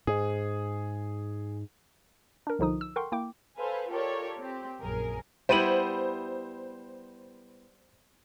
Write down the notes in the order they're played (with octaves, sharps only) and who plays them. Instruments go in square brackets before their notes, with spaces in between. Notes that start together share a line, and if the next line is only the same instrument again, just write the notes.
[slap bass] G#2 [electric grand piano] G#4
[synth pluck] D4 A#4
C2 D3 F3 D#4 D#6
E6
A4 A#4 F#5 G5 C6 C#6
A#3 E4 G5 D6
[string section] A4 B4 C5 F5 G#5
F4 G4 A4 A#4 C#5 D5
C4 G4
A#1 F#2 G#4 A#4
[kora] G3 B3 E4 [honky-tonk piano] C5 D#7 F#7